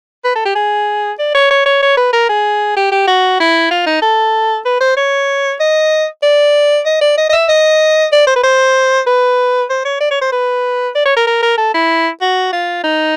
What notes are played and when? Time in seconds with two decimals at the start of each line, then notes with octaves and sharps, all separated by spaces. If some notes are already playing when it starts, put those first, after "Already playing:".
0.25 B4
0.35 A4
0.45 G4
0.55 G#4
1.19 D5
1.35 C#5
1.51 C#5
1.66 C#5
1.83 C#5
1.97 B4
2.13 A#4
2.29 G#4
2.77 G4
2.92 G4
3.07 F#4
3.40 E4
3.71 F4
3.86 D#4
4.02 A4
4.65 B4
4.81 C5
4.97 C#5
5.60 D#5
6.23 D5
6.86 D#5
7.01 D5
7.18 D#5
7.29 D#5
7.33 E5
7.49 D#5
8.12 D5
8.27 C5
8.36 B4
8.43 C5
9.07 B4
9.70 C5
9.85 C#5
10.00 D5
10.11 C#5
10.22 C5
10.32 B4
10.95 D5
11.05 C#5
11.16 A#4
11.27 A#4
11.43 A#4
11.58 A4
11.74 E4
12.21 F#4
12.53 F4
12.84 D#4